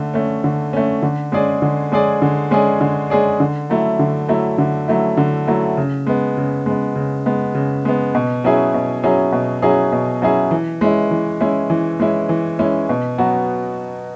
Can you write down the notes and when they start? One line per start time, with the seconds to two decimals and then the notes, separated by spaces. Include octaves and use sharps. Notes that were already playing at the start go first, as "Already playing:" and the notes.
Already playing: D3 A3
0.14 A3 C#4
0.44 D3
0.73 A3 C#4
1.02 D3
1.32 G#3 C#4 G#4 D5
1.62 D3
1.92 G#3 C#4 G#4 D5
2.22 D3
2.51 G#3 C#4 G#4 D5
2.81 D3
3.10 G#3 C#4 G#4 D5
3.40 D3
3.70 F#3 A3 E4
3.99 D3
4.29 F#3 A3 E4
4.58 D3
4.88 F#3 A3 E4
5.17 D3
5.47 F#3 A3 E4
5.77 C#3
6.07 G#3 B3
6.37 C#3
6.66 G#3 B3
6.95 C#3
7.26 G#3 B3
7.55 C#3
7.85 G#3 B3
8.15 B2
8.44 F#3 C#4 E4 G#4
8.74 B2
9.03 F#3 C#4 E4 G#4
9.32 B2
9.62 F#3 C#4 E4 G#4
9.92 B2
10.22 F#3 C#4 E4 G#4
10.51 E3
10.81 G#3 C#4 E4
11.11 E3
11.41 G#3 C#4 E4
11.70 E3
12.00 G#3 C#4 E4
12.29 E3
12.59 G#3 C#4 E4
12.89 B2
13.18 F#3 B3 F#4